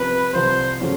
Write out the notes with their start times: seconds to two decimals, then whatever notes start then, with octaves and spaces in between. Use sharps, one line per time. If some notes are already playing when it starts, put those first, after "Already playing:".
Already playing: C2 C3 F3 B4
0.33 C2 C3 F3 C5
0.81 C#3 F3 A3 C#4 F#4